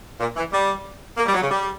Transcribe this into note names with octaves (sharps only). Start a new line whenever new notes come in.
A#2
E3
G3
A#3
G3
F#3
C#3
G3